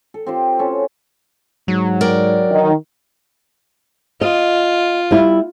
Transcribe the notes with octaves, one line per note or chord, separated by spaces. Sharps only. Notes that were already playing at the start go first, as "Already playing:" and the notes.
A4
C4 F4 G4 C5
C#4 F#4 A4
G#2 F#3
A#4 D5 G5
D#3
F4 D#5
G3 E4